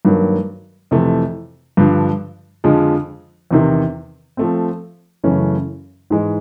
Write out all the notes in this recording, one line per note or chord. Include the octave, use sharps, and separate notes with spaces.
G2 D#3 F#3 A#3
F2 C3 E3 A3
G2 D3 F3
F2 D3 F3 G#3
E2 C3 D#3
F3 A3 C4
F#2 C#3 E3 A3 C#4
G#2 E3 G#3